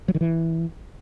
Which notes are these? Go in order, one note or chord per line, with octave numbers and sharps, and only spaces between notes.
F#3
D#3
E3